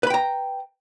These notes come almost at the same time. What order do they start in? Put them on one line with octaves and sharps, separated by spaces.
B4 B5 G5 A#5